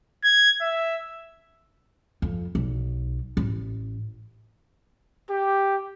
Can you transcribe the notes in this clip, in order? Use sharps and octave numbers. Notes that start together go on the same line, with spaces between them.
G#6
E5
F2
B1
A1
G4